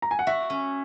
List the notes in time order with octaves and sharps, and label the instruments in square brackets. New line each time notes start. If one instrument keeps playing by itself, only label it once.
[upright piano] A#5
G#5
F#5
[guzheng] F#4 [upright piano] E5
[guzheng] C#4